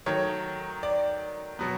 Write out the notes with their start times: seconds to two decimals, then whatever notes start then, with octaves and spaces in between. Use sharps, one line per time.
0.06 D#3 F#3 A3 C#5
0.83 D5
1.59 B2 F#3 B3